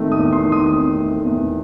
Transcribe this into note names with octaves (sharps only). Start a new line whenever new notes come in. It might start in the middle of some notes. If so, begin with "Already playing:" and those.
Already playing: D#3 A3 C4
D#6
E2
C6
D#3
D#6
C4
A3
E2